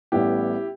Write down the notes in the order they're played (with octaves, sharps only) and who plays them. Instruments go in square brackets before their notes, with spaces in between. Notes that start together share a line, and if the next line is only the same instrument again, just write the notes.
[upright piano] A1 A2 G3 B3 E4 G4